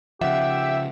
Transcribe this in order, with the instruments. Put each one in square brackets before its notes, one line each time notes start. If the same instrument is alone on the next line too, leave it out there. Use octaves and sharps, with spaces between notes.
[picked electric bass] C#3 F3 [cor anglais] G4 [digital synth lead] E5 [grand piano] F#5